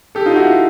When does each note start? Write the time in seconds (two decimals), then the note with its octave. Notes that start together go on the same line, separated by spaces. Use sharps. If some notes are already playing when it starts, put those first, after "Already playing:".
0.15 G4 A4
0.26 D#4 F4
0.36 E4 F#4
0.47 F4 G4